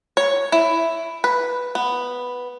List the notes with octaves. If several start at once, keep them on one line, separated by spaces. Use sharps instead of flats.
C#5
E4
B4
B3